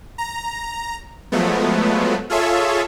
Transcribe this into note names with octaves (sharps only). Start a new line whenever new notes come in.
A#5
F3 F#3 G#3 A3 B3
F4 G#4 A4 C#5 E5